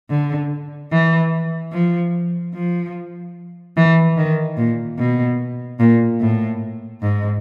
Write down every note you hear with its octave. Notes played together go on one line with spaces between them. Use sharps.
D3
E3
F3
F3
E3
D#3
A#2
B2
A#2
A2
G#2